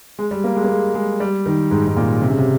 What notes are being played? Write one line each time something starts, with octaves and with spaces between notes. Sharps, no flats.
G#3
G3
A#3
G#3
A#3
G#3
G#3
G3
D#3
G#2
G#2
A#2
C3
C#3
C3